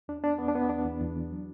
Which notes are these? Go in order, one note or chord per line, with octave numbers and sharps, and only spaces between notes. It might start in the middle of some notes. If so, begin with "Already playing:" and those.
E2 D4
B3 D4
E2 B3
D4
B3
E2 D4
E2
E2
E3
F#3